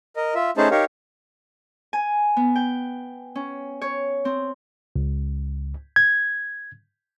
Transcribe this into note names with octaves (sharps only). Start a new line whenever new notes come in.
A#4 D#5
F4 E5
A3 C#4 D#4 G#4 C5 A5
D#4 G4 A#4 C#5 F5
G#5
B3
G5
C#4
C#5
C4
C#2
G#6